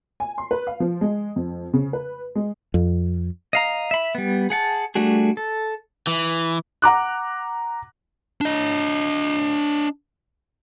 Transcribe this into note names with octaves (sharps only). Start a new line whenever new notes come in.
G#5
C6
B4
F5
F3
G#3
F2
C#3
B4
G#3
F2
D#5 F5 A#5
E5 B5
G3 B3
G#4 F#5 A5
G3 A3 D4 F#4 G#4
A4
E3
F#5 A#5 D6 F#6
D4 D#5